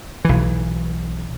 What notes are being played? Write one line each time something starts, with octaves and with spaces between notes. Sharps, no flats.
B1 E3